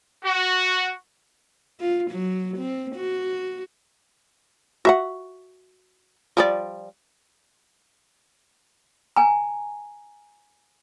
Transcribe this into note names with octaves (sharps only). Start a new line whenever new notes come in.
F#4
F4
F#3
C4
F#4
F#4 E5 F#5
F3 G3 D5
G#5 A#5